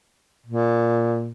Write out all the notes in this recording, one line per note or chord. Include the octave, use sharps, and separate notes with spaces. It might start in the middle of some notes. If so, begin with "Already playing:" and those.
A#2